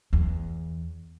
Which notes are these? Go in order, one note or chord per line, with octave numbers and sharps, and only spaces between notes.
E2